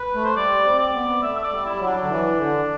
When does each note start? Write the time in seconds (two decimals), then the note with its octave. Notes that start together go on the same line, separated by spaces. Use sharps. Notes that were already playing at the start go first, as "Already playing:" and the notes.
Already playing: B4
0.15 A3
0.24 C5
0.36 G3 D5
0.65 C4
0.79 D5
0.93 B3
1.22 A3 E5
1.37 E5
1.44 D5
1.50 G3
1.65 G3 E4
1.80 F#3
1.87 D4
2.02 D3
2.08 E3
2.37 D3